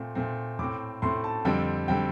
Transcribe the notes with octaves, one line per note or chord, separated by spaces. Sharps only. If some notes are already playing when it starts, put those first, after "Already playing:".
Already playing: A#2 A3 C4
A#2 A3 C4
A2 A3 C4 D6
A2 A3 C4 C6
A5
F2 D3 G3 C4 G5
D3 G3 C4 G5